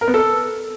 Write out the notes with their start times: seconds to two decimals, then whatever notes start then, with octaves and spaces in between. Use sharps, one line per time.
0.01 A#4
0.08 B3
0.14 A4